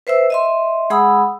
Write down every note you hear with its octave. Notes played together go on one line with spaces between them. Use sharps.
B4 C5 E5 E6
D#5 E5 C6
G#3 G#4 F#5 B5 D#6 E6